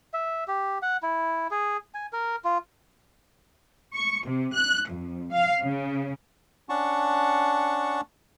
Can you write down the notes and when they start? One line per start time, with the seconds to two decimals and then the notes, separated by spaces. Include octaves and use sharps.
0.14 E5
0.48 G4
0.82 F#5
1.03 E4
1.51 G#4
1.94 G#5
2.13 A#4
2.44 F4
3.94 C#6
4.24 C3
4.55 F#6
4.90 F2
5.32 F5
5.63 C#3
6.69 C#4 D4 F#5 A5 C#6